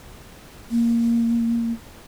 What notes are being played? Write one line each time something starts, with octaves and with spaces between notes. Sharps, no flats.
A#3